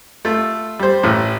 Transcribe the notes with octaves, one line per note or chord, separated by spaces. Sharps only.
A3 F4
G3 C5
A1 A2